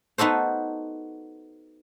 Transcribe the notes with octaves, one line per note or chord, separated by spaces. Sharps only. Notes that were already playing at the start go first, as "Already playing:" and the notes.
B3 D#4 F#4 A4 C5